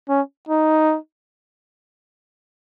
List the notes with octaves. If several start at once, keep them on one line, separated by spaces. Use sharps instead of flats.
C#4
D#4